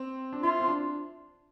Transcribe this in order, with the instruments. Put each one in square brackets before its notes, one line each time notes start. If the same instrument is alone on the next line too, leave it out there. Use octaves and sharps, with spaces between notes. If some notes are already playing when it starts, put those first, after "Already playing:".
Already playing: [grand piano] C4
D4
[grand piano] E4 [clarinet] F4
[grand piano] C4
D4